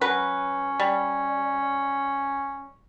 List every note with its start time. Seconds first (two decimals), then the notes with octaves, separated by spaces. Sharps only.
0.01 F#3 C#4 B4
0.80 G3